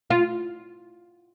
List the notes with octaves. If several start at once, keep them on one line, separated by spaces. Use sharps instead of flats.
F4